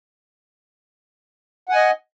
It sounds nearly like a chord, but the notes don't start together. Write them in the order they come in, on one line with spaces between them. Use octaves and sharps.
F#5 G#5 D#5